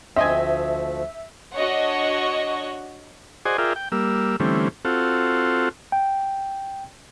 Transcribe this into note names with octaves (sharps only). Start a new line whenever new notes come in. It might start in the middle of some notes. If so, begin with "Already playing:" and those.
D2 F3 A3 C4 D#5 E5 G#5
D4 F#4 C#5 D#5 F#5 C#6
F#4 G#4 C5 D5 D#5 G#5
F4 G#4 A#4 D5 E5 G5
G5
G3 A#3 E6
D3 E3 G3 A3 C4 C#4
C4 F4 F#4 A4
G5